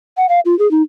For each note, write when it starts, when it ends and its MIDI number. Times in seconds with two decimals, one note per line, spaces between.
0.17 0.26 78
0.29 0.40 77
0.45 0.57 65
0.59 0.69 68
0.71 0.82 63